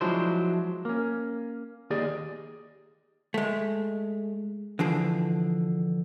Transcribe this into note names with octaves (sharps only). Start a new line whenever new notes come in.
F3 F#3 G#3 D4 E4 C5
A#3 C#4
D#2 G4 G#4 D5 D#5
G#3 A3
D3 E3 F3 G#4